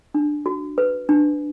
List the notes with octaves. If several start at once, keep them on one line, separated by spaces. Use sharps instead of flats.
D4
F#4
B4
D4